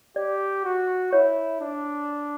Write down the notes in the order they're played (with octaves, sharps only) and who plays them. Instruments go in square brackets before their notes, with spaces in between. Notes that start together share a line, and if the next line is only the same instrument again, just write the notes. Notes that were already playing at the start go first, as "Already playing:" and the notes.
[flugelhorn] G4 [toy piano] D5
[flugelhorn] F#4
[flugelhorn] E4 [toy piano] C#5
[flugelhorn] D4